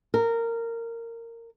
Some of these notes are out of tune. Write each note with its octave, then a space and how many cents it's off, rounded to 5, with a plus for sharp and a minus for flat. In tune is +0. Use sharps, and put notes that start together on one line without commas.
A#4 -15